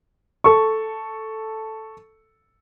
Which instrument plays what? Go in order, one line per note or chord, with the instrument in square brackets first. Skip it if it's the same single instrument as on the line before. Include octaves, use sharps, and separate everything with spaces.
[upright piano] A4 C#6